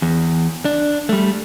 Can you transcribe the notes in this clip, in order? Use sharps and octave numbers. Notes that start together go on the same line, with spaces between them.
E2
D4
G3 A3